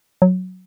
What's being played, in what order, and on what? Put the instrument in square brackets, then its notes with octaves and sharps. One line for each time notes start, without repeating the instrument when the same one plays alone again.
[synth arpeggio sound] F#3